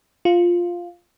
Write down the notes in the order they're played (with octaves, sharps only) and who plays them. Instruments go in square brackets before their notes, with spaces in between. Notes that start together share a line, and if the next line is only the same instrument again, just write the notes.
[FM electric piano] F4